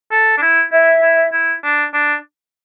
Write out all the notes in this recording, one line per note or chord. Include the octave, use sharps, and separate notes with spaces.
A4
D4
E4
E4 E5
E4
E4
D4
D4